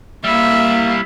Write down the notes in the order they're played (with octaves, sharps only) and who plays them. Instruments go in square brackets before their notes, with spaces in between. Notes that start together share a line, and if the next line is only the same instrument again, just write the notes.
[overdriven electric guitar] G3 E4 [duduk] A#3 [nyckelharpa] E5